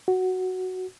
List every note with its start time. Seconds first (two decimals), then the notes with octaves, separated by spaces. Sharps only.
0.08 F#4